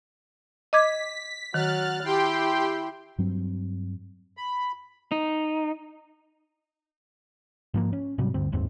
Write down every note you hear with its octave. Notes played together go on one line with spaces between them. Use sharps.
D#5 D6 G#6 B6
D#3 F#3 F6 F#6 A6
E4 G4 G5 C6
G2 F#3 C4
B5
D#4
G#2 F3 A#3
C#4
G#2 C3 F#3 G3
D2 G2 C4
F#1 D#2 G#2 C4